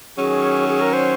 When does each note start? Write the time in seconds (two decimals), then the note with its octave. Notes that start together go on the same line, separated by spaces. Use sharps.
0.17 D#3 F#3 C#4 G#4
0.69 G#4
0.81 A#4
0.93 C5